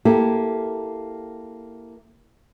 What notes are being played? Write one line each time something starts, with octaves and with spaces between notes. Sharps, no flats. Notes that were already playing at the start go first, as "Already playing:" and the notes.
A#3 E4 G4 A4